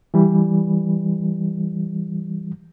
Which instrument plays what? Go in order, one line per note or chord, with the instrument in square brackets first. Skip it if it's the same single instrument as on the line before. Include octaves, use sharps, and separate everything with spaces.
[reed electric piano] E3 G3